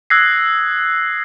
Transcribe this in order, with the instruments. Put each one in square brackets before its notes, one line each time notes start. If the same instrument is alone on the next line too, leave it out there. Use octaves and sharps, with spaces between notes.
[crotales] D#6 E6 F#6 G#6 A#6 C7